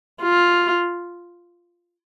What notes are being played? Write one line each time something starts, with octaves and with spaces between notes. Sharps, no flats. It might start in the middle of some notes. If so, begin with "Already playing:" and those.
F4